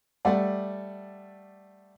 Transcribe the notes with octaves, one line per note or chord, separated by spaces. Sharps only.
G3 A3 D5 F#5